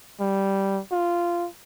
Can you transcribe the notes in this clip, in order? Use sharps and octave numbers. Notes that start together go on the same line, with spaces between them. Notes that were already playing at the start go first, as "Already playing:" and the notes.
G3
F4